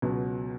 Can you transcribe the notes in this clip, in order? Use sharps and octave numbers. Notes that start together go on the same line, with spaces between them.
C#2 B2 F#3